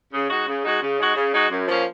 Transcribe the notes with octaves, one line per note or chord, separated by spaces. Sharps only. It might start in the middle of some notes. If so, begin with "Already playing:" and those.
C#3
G#3 D#4 F#4
C#3
G#3 D#4 F#4
C#3
G#3 D#4 F#4
C#3
G#3 D#4 F#4
F#2
F3 A#3 C#4